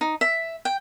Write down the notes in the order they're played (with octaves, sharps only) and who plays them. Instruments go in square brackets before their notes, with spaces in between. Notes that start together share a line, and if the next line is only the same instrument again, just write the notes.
[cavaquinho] D#4
E5
G5